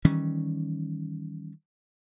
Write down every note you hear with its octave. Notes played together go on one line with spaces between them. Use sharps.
D#3 E3 G3 C#4